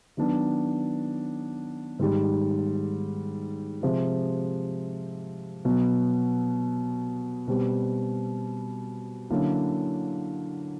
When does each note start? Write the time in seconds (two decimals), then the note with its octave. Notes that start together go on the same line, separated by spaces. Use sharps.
0.17 D#3 F#3 B3 D4
1.99 G#2 D#3 G3
3.82 C3 F3 G#3
5.65 B2 F#3 B3
7.47 B2 G3 C4
9.30 D3 F#3 A#3 C#4 E4